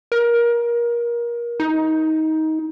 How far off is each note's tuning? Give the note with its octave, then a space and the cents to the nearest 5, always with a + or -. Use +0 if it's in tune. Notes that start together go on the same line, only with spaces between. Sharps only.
A#4 +25
D#4 +20